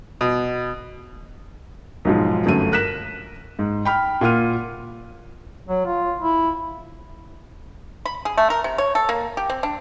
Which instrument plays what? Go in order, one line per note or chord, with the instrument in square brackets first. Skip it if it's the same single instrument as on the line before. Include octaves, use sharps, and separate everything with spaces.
[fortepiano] B2
[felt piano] B1 G#2 F3
G1 F#2 A3 D#7
A#4 F#6 B6 E7
G#2
G5 B5 F6
A#2 F4 F#5 F6 D#7
[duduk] F#3
F4
E4
[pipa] B5
G#4
A3
A#4
C3
C#5
A4
A#3
G4
C4
D4